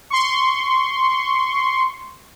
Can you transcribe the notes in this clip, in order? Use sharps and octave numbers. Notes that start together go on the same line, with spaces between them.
C6 C#6